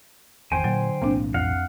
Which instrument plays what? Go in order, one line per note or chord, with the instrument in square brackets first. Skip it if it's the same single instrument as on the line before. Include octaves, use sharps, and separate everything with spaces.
[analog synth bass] G#1 [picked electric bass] E2 [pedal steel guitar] C5 G5 G#5
[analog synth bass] A#2 [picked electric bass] D3 [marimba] F#3
[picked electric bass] B1 A2 E3 [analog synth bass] A#3 [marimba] C4 D4
[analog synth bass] F2 [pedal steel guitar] F5 F#5